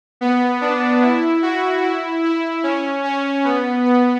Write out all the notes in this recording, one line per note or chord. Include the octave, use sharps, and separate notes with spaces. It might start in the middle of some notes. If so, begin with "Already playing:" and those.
B3
D4
E4
F#4
E4
E4
C#4
C#4
B3
B3